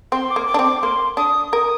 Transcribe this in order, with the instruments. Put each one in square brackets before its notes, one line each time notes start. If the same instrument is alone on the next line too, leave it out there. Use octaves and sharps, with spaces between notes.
[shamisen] C4 [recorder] C6
[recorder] D6
[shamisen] A#3
[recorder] D6
[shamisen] D4
C4
[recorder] D6
[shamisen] A#3 [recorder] C6
[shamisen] D4 [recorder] D#6
[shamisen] A#4 [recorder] D#6